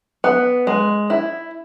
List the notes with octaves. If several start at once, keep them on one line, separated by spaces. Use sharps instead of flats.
B3
G#3
E4